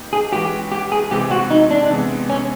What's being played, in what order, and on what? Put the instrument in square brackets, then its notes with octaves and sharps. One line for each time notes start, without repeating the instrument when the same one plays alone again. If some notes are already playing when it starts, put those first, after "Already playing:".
Already playing: [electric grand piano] A#3 D#4 G4 B4
[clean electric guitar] G#4
[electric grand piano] E3 G#3 C#4 F#4 B4 [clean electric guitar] G4
[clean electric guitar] G4
G#4
[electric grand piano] C3 E3 G#3 C4 [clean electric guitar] G4
[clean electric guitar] F#4
D#4
D4
[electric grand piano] C3 E3 G#3 B3
[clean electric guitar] C#4